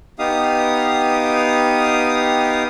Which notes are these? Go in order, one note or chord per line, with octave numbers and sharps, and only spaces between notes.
B3 D#4 G4 F5 D#6